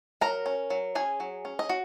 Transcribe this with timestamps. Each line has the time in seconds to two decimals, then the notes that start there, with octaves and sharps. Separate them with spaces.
0.21 F#3 A#4 A#5
0.46 C#4
0.70 F#3
0.95 C#4 G#4 G#5
1.20 F#3
1.45 C#4
1.59 D#5
1.69 F#4